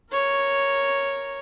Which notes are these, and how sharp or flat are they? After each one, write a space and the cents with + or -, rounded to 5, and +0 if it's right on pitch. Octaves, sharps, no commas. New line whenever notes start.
A#4 +0 C#5 +0